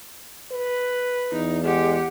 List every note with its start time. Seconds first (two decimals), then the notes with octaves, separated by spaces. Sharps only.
0.52 B4
1.32 E2 D#4
1.64 G#3 G4 F#5